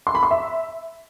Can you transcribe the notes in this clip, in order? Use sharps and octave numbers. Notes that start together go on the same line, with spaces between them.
C6
B5
C6
E5